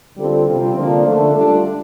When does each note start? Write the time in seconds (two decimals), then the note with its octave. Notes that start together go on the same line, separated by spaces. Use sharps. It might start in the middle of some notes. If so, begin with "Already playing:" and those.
0.16 D3 G3 C4 F4 A4
0.46 C3 G3 C4 F4
0.75 D3 F3 A#3 D4
1.05 D3 A3 D4
1.34 G3 D4 F4 A4